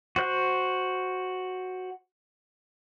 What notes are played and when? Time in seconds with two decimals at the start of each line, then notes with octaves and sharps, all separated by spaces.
0.16 F#4 C5 F#6